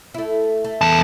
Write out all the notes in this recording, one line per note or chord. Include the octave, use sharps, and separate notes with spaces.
A3 E4
A3
E2 A5